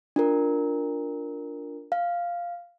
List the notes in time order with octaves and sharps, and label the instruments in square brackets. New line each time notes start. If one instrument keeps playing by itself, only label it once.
[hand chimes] D4 F4 A#4
F5